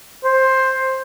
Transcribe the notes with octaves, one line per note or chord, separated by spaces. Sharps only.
C5